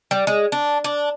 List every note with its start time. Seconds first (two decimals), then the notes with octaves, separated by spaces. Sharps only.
0.11 G3
0.27 G#3
0.52 D4
0.84 D4